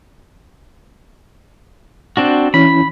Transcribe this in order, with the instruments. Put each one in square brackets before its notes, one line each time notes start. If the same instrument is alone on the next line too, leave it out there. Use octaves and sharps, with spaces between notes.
[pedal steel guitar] C4 D4 F#4
[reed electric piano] E3 C#4 E4 [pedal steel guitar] B5